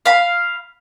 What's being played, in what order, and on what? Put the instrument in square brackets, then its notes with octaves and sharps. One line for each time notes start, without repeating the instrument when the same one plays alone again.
[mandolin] F5 B5